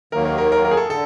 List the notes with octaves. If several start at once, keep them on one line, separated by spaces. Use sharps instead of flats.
D#2 D#3 F#3 A#3 A#4
A#4
A#4
A#4
A#4
G#4
A4
D3 A4